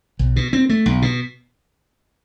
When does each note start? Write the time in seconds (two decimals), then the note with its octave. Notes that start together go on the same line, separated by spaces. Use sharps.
0.19 B1
0.36 B2
0.53 C4
0.69 A3
0.86 B1
1.02 B2